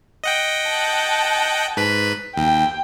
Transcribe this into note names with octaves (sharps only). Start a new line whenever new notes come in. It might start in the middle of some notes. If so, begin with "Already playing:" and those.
D#5 F#5 G5
A5
G#2 B4 B5
D#2 G5